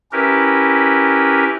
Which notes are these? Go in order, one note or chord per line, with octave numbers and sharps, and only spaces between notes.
C#4 E4 G4 A#4 B4